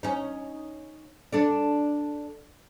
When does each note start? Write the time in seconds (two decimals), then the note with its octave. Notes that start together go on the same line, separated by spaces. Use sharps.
0.03 C#4 D#4
1.32 D4 A4 D5